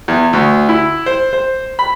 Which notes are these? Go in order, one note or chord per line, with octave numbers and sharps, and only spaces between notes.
E2
D2
E4
C5
C5
B5